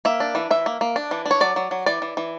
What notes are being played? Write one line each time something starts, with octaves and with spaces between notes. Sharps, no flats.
A#3 E5
D4
E3
E3 E5
A#3
A#3
D4
E3
D4
C#5
F#3 D5
F#3
F#3
E3 D5
E3
E3